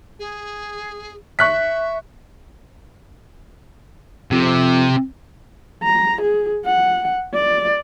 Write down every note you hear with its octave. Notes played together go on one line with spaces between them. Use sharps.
G#4
E5 C#6 F#6 B6
F2 C3
A#5
G#4
F#5
D5